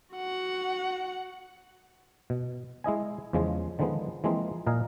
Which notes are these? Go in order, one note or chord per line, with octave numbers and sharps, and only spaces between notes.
F#4 F#5
B2
G#3 E4 D#5 G#5
E2 C#3 F3 G#3
D3 D#3 F3 G#3 B3
E3 F3 G#3 A#3 C4
A#2 A#4 D#5 F5 G#5